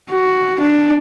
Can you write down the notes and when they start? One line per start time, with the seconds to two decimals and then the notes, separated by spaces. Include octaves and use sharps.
0.10 F#4
0.60 D4